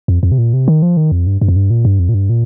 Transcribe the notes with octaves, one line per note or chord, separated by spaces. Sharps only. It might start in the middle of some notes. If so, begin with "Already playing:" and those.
F2
F2
C3
A#2
C3
D#3
F3
D#3
F2
G2
G2
F2
G2
A#2
G2
F2
A#2
G2
A#2